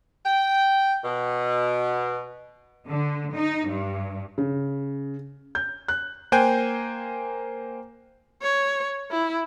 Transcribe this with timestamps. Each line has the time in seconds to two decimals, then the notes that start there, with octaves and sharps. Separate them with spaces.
0.25 G5
1.03 B2
2.87 D3
3.34 D#4
3.69 G2
4.38 C#3
5.55 G6
5.88 F#6
6.32 A#3 C5 G5 G#5 F#6 G6
8.42 C#5
9.11 E4